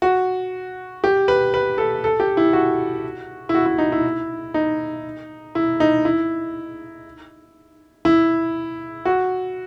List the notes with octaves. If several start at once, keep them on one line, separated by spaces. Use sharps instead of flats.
F#4
G4
B4
B4
A4
A4
G4
E4
F#4
E4
F#4
E4
D#4
E4
D#4
E4
D#4
E4
E4
F#4